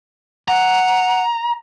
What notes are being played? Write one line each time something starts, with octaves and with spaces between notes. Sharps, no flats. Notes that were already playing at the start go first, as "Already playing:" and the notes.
F#5 A#5